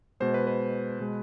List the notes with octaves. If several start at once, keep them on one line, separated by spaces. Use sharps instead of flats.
B2 G#3 C5
B4
B4
B2 G#3